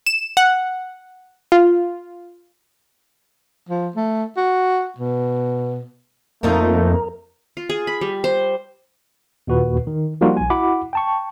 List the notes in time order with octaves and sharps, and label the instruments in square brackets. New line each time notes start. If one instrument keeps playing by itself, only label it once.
[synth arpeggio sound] E7
F#5
F4
[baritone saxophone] F3
A3
F#4
B2
[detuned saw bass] F2 [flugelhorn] A3 [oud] A#3 D#4 F4 [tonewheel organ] A#4
[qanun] F4
G#4
B5
G3
C5
[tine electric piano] D#2 A#2 F#4 B4
D#3
F3 G3 A#3 D#4 F4 F#4
A#1 G#5
E4 F#4 F#5 B5 D6
G5 A5 C#6